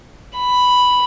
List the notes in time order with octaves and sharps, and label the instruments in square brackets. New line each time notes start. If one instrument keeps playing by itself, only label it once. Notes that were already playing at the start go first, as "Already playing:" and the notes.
[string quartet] B5